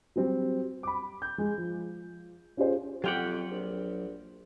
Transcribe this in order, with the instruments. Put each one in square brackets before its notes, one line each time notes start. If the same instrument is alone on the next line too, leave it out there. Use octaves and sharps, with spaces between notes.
[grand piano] F#3 G3 C4
B5 D6
G6
G#3
F3
C#4 F4 G4 G#4 C5
[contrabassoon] F2 [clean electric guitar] F#3 F4 F#5 [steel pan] G4 G5
[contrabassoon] A#1